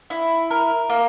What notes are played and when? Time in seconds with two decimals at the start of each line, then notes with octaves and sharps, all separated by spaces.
0.10 E4
0.50 A#4
0.89 A#3